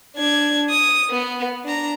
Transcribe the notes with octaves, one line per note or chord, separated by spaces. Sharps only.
D4 G#6
D#6
B3
D4 A#5